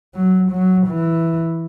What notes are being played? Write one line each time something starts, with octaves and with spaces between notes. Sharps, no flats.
F#3
F#3
E3